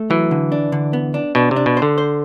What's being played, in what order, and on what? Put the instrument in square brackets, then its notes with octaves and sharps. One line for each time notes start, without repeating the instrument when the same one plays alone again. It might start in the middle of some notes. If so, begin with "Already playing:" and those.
Already playing: [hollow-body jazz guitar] A3
[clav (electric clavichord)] E3 [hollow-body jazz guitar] F#3
[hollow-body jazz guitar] D3
D4
D3
B3
D4
[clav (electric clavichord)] B2 [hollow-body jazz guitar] D4
[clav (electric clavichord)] C3
[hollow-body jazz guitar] D4
[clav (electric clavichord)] B2
[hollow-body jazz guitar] C5
[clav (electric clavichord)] D3
[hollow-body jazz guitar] C5